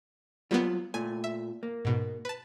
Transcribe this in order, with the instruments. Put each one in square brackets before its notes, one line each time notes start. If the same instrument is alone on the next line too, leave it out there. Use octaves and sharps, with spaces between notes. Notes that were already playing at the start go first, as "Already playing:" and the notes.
[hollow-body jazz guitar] F#3 F4 [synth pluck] G3 A#3 B3
[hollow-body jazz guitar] A#2 A3 [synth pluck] G#5
[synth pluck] E5
[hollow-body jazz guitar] A#3
[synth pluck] G#2 B2
B4 A5